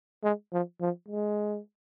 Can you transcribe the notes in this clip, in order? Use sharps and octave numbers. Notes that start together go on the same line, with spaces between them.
G#3
F3
F3
G#3